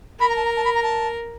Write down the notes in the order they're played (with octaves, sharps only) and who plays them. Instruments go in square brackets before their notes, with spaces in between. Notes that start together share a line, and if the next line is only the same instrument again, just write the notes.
[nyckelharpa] A#4 [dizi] B5
[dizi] A#5
A5
A#5
A5
B5
A#5
A5